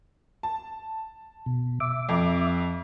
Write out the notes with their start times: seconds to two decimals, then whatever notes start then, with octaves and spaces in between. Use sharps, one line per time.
0.43 A5
1.46 B2
1.80 E5 D6
2.09 F2